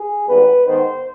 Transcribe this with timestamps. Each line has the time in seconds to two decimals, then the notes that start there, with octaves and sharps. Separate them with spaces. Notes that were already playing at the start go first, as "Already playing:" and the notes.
Already playing: G#4
0.28 G#1 G#2 G3 B3 B4
0.66 G#2 D#3 B3 C5